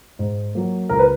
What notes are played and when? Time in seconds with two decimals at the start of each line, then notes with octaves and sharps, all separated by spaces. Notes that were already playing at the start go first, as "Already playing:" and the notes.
0.19 G#2
0.55 F#3 A#3
0.89 C#2 A#4
0.99 B4